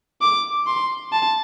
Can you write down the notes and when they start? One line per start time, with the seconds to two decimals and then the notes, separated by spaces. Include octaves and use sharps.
0.21 D6
0.67 C6
1.12 A5